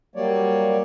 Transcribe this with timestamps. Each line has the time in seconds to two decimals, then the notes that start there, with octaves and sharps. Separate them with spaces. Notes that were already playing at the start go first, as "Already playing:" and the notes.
0.16 F#3 G3 A#3 C#5 D5